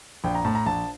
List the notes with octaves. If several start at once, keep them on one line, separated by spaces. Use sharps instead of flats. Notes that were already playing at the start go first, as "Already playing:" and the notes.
A#1 G5
A#5
A2 A5
A#5
A#1 A5